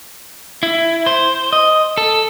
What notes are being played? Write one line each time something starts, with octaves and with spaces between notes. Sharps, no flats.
E4
C5
D#5
A4